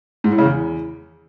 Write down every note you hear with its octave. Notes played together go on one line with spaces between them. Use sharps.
G#2
A2
C#3
E2